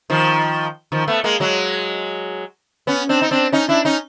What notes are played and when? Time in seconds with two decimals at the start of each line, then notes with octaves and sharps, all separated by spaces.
0.10 D#3 F3
0.92 D#3 F3
1.08 A3 B3
1.24 G#3 A#3
1.40 F#3 G#3
2.87 B3 C#4
3.09 C4 D4
3.22 D#4
3.31 C4 D4
3.52 C#4 D#4
3.69 D4 E4
3.85 C#4 D#4